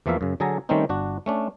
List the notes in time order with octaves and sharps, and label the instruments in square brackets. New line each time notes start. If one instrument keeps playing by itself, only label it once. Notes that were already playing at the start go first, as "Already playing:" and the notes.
[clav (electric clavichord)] E2 E3 F3 A#3 E5 F5
F#2 C#3
D3 F#3 G#4 A4 G#5 A#5
D#3 G3 A3 C4 C#4 D#4
G1 D4 F#4
A3 C#4 D4